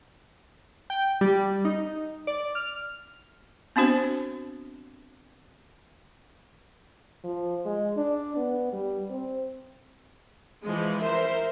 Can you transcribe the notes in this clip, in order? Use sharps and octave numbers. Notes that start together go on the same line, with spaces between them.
G5
G3
D#4
D5
F6
B3 C4 D4 F#4 C5
F3
G#3
D4
B3
G3
C4
E3 F3 G#3
A#4 C5 E5